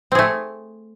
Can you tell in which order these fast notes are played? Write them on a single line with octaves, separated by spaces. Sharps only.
C4 G#4 A3